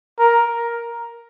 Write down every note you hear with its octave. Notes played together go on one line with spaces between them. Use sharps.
A#4